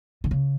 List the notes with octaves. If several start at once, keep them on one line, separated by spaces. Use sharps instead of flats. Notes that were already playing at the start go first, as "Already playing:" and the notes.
D3
C#3